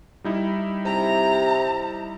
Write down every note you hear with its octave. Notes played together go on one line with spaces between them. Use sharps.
G3 D#4 E4
C3 A#5